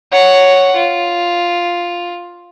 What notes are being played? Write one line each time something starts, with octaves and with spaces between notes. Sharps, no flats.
C#5 F#5
F4